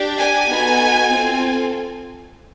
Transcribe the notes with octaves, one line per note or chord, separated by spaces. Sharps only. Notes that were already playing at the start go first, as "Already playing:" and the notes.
Already playing: D4 G4
G#5
B3 D#4 F#4 A4
C4 F4 A4